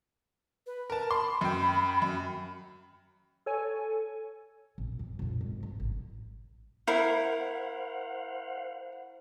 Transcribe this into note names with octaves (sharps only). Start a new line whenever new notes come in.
B4
A#4 A5
B5 C6
F#2 G5
F#2
A4 C#5 G#5
A#1
F2
A#1 F2
G#2
G1
A1
E4 A#4 C5 F5 F#5